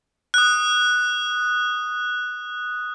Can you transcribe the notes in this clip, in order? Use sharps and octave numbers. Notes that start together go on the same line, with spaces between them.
D#6 F#6